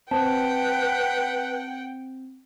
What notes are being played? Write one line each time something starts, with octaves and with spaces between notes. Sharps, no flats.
C4 B4 F#5 G5 A5